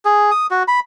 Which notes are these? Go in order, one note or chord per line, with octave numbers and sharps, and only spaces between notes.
G#4
D#6
F#4
B5